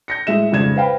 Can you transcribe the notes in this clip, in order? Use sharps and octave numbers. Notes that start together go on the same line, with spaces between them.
G6 A#6 C#7
A2 G#3 E5 E7
F2 G#2 C#3 D5 G#6 E7
B4 C5 F5 G5 B5